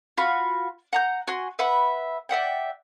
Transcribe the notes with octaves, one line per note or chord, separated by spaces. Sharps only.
F4 F#4 B5
F#5 A#5 G6
F#4 G#5 C6
B4 E5 F#5 B5
D5 E5 F#5 G5